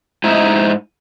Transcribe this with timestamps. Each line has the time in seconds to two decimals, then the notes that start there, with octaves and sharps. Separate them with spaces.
0.24 G#2 D#4 E4